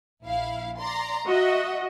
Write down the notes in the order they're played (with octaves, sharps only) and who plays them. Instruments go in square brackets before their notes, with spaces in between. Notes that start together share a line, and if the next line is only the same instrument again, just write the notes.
[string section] A#1 E4 F5
D5 A#5 C6
[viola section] F#4 D#5 [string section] E5 F#5